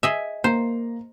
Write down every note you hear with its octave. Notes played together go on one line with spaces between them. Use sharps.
G#4 D#5 E5
A#3 C5 A#5